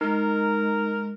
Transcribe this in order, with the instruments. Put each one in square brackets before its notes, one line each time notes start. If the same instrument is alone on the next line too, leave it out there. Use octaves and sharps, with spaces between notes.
[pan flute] G#3 [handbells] D#4 [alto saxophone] A#4